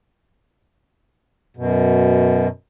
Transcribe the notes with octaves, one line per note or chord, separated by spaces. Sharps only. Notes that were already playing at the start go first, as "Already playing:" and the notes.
F#2 B2